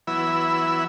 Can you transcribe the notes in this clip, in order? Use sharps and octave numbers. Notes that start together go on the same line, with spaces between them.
E3 F#3 B3 E4 B5 E6